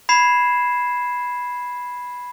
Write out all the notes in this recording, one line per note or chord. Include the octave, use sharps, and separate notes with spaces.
B5 G#6 C7 E7